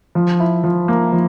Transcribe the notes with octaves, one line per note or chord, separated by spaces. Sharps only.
F3
E4
F3
A#3
F3